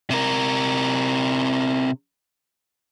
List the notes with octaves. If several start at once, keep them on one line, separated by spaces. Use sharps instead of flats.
C3 A#4